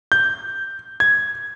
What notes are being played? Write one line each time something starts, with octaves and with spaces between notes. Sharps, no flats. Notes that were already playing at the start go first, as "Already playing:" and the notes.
G6
G#6